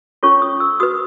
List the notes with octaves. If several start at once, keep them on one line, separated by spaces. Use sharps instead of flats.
C#4 F4 A4 C#5 C#6
D#6
E6
F#4 B4 D#6